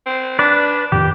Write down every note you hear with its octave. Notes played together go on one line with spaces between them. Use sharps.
C4
D4 B4 D5
F2 A2 D#3 G4